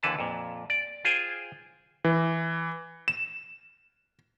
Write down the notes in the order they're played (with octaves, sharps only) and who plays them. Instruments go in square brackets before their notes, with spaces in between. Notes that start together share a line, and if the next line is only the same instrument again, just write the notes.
[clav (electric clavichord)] D#2 D3 E3 B4 A5
F2 A#2
D5
F4 G#4 C5 G5 G#5
[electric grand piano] E3
E7